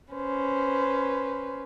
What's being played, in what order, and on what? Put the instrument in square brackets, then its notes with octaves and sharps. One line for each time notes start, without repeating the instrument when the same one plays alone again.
[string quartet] C#4 B4 C5